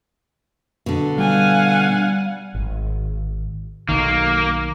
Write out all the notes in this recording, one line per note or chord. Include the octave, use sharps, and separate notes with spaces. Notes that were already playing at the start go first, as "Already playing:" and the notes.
B2 D3
G3 F5 F#5 G#5
G#1
B1 D#3 A#3